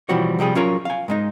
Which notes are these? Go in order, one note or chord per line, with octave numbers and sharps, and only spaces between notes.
B2 E3 F3 G3 F#4 C#5
C3 F3 G3 G#4
F#3 C#4 F4 A#4 C#5
F5 G#5
G#2 G#3 D#4